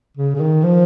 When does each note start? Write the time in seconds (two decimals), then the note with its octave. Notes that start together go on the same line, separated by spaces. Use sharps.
0.17 C#3
0.36 C#3
0.40 D#3
0.64 F3